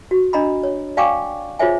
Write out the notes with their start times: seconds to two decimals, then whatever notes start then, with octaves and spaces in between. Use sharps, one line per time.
0.11 F#4
0.33 D4 D#5 A#5 B5
0.63 C#5
0.97 D5 F5 G5 G#5 C#6 D6
1.59 F4 G#4 C5 C#5 E5 G#5